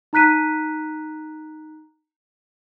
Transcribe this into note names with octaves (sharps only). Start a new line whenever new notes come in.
D#4 A#5 F#6 B6 D#7